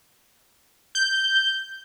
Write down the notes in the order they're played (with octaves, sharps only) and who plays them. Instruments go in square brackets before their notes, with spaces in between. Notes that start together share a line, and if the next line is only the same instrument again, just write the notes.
[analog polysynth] G6